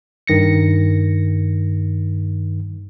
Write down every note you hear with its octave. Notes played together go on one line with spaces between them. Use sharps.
G2 D#3 A#6 C#7